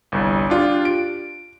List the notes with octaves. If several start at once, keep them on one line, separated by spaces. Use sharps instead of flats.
G1 C2
D4 F4 G4
D7